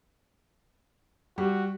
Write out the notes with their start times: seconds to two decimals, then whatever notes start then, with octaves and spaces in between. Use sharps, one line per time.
1.38 G3 F#4